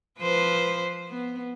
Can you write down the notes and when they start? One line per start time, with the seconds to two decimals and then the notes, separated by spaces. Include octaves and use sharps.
0.19 F3 B4 C5
1.09 B3